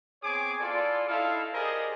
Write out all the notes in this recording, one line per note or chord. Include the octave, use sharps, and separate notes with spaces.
B3 C4 G#4 C#5 G#5 D6
E4 F4 A4 D5
D#4 E4 A4 F5
G4 G#4 A#4 C5 D5 D#5